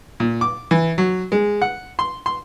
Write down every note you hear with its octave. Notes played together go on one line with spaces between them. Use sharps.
A#2
D6
E3
F#3
G#3
F#5
C6
C6